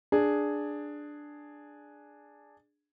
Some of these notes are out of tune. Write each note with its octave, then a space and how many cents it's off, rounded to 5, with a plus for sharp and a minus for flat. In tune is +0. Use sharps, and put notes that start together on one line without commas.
D4 +5 G#4 +0